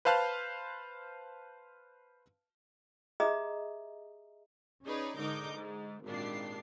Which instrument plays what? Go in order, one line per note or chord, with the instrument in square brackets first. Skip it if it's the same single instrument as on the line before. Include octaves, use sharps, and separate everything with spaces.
[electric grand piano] B4 C5 F5 A5 F6 F#6
[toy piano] G4 G#4 D#5 E5 A#5 D#6
[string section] C#4 D#4 G#4 B4 C#5 D5
G#2 D3 D#4 A#4 D6 G6
G#2
G#1 A#2 D4 G4 C7